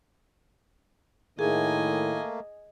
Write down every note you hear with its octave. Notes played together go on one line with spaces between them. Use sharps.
A2 D#3 A3 A#3 G#4 D#5 G#5